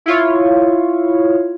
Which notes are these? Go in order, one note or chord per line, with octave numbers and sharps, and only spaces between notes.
E4 F4 C#5